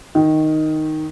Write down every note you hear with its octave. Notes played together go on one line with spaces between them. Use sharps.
D#3